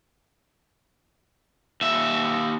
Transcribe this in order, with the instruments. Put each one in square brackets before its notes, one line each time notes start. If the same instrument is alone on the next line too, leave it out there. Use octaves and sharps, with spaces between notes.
[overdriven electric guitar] D#2 E5